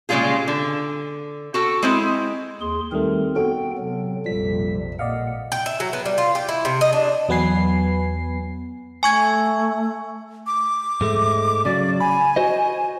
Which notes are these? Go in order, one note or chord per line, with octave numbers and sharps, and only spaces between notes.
A#2 C#3 G3 G#3 F4 G#4
D3
F#4 A4 G5
G#3 C4 E4
D#2 G#4 C6
D#3 G3 A3 C4 A#4
B3 F#4 A4 G5
C3 F#3
A#1 F2 C3 F3 G3 B6
A#2 D5 D#5 F5 F#5
G5
E5
F#3
B3
G3
F4
G4
E4
C3
D#5
D4
E2 F#3 B3 B4 G#5 C7
A3 G#5 C#6 G#6
D6
G#2 G#3 A3
C#3 F#3 D5
G#5 B5
F#4 C5 D#5